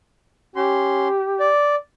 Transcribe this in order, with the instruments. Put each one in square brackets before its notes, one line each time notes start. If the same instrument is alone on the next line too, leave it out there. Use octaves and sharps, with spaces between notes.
[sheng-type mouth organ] C#4 C6 [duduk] G4
[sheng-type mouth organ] D5